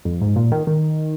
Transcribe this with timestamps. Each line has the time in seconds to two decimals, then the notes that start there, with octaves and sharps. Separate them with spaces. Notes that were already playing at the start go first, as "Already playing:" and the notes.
0.05 F2
0.21 G#2
0.36 A#2
0.52 D#3
0.67 D#3